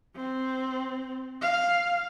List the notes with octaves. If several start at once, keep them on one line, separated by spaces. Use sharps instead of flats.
C4
F5